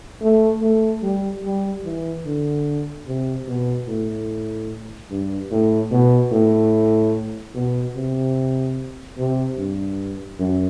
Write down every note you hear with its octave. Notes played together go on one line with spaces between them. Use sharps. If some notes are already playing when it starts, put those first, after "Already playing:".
A3
A3
G3
G3
E3
D3
C3
B2
A2
G2
A2
B2
A2
B2
C3
C3
G2
F#2